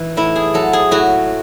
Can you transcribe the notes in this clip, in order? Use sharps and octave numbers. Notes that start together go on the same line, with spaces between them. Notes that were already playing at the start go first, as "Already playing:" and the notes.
Already playing: E3
A2 E4
G#4
F#3 A4
G#4
A2 F#4